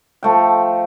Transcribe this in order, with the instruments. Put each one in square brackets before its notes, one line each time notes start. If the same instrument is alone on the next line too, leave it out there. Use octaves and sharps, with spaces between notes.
[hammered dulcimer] F3 A3 G5